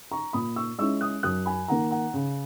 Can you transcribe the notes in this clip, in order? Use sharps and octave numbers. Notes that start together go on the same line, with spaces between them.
A#5 C#6
A#2 B5 D#6
C#6 E6
G#3 C#4 E4 C#6 E6
D#6 F#6
F#2 D#6 F#6
G#5 B5
D#3 A#3 F#5 A#5
F#5 A#5
C#3